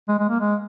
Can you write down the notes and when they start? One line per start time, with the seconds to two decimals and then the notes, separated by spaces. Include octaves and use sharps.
0.09 G#3
0.19 G#3
0.29 A#3
0.40 G#3